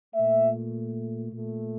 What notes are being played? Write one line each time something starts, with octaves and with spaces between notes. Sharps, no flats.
A#2 A3 E5
A#2 A3